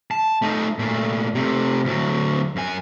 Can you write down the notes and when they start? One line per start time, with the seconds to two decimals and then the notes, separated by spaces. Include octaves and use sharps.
0.11 A5
0.42 A3 D#4
0.79 A#2 A3
1.35 C3 A3
1.85 D2 F#3
2.56 F#2 G#5